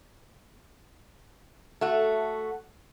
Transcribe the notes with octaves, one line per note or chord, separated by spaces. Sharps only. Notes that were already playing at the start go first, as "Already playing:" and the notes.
A3 F#4